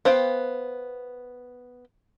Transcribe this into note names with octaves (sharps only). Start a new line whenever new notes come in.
B3 C5 F5 G5